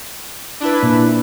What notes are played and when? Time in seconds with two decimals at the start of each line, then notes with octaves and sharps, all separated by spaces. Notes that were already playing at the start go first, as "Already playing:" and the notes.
0.60 D4 E4 B4
0.83 A#2